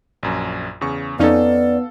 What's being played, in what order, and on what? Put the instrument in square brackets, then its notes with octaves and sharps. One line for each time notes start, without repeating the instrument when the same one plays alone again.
[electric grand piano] A#1 F#2
E2 C#3 C#6
[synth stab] F2 C#4 D#4 [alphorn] B3 [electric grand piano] A4 F5 [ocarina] D5